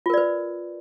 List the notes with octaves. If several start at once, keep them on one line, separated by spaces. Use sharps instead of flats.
F4 A#4 B4 D5